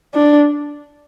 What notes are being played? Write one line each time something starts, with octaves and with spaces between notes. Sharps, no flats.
D4